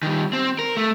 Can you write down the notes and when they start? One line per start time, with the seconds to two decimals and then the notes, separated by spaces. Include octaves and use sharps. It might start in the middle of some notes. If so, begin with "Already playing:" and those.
0.03 D#3 G3
0.33 C4
0.59 A#4
0.77 A3